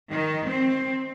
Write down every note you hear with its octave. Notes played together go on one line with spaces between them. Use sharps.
D#3
C4